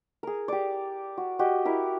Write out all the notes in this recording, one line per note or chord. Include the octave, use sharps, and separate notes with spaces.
G#4 A#4
G4 D5
F#4
F#4 G4 D#5
E4 A#4 E5